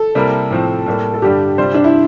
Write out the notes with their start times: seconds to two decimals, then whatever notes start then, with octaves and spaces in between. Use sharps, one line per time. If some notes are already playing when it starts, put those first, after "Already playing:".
Already playing: A4
0.15 C3 G3 A#3 E4 A#4
0.51 A2 F3 C4
0.86 A2 G3 A#3
1.14 A4
1.22 G2 D3 G3 D4 G4
1.58 C3 G3 D4 F4 C5
1.74 D4
1.84 E4